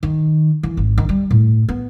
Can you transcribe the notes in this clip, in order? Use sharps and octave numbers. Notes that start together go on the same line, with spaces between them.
D#3
E3
G#1
D#3
G3
A2
B3